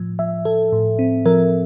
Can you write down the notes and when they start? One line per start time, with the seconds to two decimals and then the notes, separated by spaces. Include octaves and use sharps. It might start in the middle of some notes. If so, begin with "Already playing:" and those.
Already playing: A2 F3
0.19 F3 E5
0.45 F3 A4
0.73 A2
0.99 C4
1.26 F3 A#4